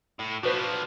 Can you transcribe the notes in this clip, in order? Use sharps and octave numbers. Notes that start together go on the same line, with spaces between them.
A2
F3 D4 F#4 B4 C5